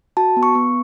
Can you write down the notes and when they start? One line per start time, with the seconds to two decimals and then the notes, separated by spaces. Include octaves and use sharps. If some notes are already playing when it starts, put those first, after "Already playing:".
0.17 F#4 A5
0.37 B3
0.43 C#6
0.55 B3